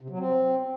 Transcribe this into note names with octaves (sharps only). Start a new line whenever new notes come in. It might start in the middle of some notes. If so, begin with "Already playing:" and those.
C3
F#3
C4